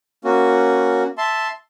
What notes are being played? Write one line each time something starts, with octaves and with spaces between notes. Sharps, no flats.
A#3 C#4 F#4
E5 A5 C6